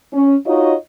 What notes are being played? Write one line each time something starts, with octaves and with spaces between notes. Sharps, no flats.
C#4
D#4 F4 F#4 C#5 D#5